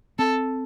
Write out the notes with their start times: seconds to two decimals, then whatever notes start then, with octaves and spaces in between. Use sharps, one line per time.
0.19 C4 A4